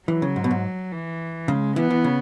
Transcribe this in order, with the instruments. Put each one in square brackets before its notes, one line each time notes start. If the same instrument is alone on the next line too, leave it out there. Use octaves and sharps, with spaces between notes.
[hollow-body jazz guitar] E3 [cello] F#3
[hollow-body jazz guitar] C#3
G#2
B2
G#2
[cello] E3
[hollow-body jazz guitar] C#3 [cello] G#3
[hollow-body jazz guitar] E3 [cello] B3
[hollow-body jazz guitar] E3
C#3